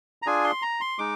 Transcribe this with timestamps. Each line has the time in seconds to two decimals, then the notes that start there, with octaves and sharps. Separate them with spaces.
0.22 A#5
0.26 D4 F4 G#4 G#5
0.44 C6
0.62 A#5
0.81 C6
0.99 G#3 D#4 D6